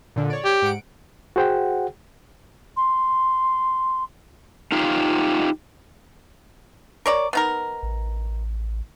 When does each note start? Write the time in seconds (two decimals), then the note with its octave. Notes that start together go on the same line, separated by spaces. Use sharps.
0.16 A#2 D3
0.30 C#5 D5
0.45 G4
0.62 G#2 F#5 D7
1.36 F#4 G#4 C5 F#5 G5
2.77 C6
4.72 D#4 F4 G4 F5
7.06 A#4 C#5 D5
7.33 B3 D#4 A#4
7.83 A1